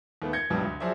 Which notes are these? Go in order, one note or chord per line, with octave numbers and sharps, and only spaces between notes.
D#2 A3 B3
G6 G#6 A#6 C#7
C#2 G2 B2 E3 F#3 G3
D2
F3 F#3 G#4 C5 D5 E5